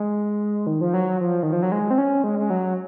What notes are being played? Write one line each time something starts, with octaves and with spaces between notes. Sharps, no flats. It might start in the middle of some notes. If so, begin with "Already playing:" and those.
Already playing: G#3
D#3
F3
F#3
F3
D#3
F3
F#3
G#3
C4
C#4
G#3
G#3
F#3